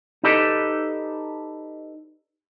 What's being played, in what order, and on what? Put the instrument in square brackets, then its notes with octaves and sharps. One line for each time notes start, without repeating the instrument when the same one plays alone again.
[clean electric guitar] D#4 G4 A4 B4 D5 D#5